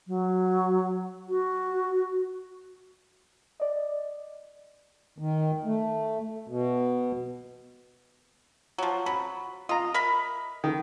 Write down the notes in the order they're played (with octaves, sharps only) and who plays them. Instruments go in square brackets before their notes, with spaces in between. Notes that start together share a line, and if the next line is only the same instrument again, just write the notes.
[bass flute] F#3
F#4
[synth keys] D5 D#5
[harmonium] D#3
A3
B2
[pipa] F3 F#3
[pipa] F#3 [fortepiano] B5
[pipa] F4 [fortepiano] D#5 A#5
[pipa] A#4 E5 B5
[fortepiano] D#3